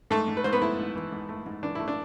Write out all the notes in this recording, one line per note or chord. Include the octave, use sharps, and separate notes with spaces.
G#2 A3 A4
G#2
B4
G#2 C5
B3 B4
A3 E4
G#2
E3
G#2
A3
G#2
E3 D4
A3 E4
D4